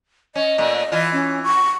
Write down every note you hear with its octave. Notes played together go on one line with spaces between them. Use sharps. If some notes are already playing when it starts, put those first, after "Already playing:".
C#4 D#5
A#2 A3
E3 F4
C#4
C#6